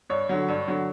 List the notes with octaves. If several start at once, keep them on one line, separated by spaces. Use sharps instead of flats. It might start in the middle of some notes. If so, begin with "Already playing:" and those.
G2 C#5
D3 F#3
G2
D3 F#3